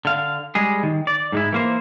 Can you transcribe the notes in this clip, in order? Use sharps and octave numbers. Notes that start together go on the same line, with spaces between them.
D3 F5
G3 G#3 G#4
D#3
D5
G#2 G#3 E4
E3 A#3 C5